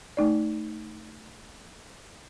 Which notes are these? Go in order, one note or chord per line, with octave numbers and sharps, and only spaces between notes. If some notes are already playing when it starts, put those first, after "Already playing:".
A3 D#4 D5